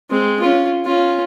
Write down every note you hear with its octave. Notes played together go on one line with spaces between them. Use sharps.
G#3 C4
C#4 F4
C#4 F4